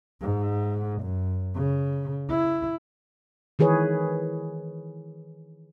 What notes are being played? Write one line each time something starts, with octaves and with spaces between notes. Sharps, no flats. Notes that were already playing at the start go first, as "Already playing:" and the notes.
G#2
F#2
C#3
E4
D#3 E3 G#4 B4 C#5